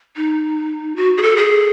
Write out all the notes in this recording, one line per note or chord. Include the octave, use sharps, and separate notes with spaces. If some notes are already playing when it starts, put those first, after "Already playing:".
D#4
F#4
G#4
A4
G#4